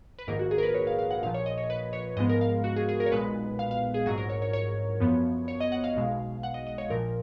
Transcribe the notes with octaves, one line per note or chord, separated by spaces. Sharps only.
B4
A#1 G#2 D#3 A#3 A#4
F#4
G#4
A#4
B4
C#5
F5
F5
F#5
A#1 A#2 F3 F5
C#5
D#5
C#5
B4
C#5
G#2 F3 G#3 B3 D#5
A#4
F5
F#4
G#4
G#4
A#4
C#5
B1 A#2 G#3 B3 B4
F5
F5
G#4
A#1 G#2 F#3 G#4
A#4
C#5
C#5
C#5
F#2 F3 B3
C#5
D#5
F#5
F5
B1 B2 G#3
F#5
D#5
D#5
C#5
A#1 A#2 F3 A#4